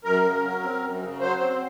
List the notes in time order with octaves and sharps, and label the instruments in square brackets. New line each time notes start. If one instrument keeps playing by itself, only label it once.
[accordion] F#2 A#4
C#3
F#3
C4
F#2
C#3
F#3 C5
C4